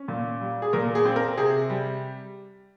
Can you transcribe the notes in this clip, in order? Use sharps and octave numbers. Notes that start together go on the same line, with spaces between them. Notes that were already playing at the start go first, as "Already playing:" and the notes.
Already playing: C#4
A#2
G3
G#4
A#2 A#4
G#4
C4
A#4
C3 G#4
G3